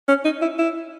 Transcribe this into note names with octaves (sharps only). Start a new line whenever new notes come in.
C#4
D#4
E4
E4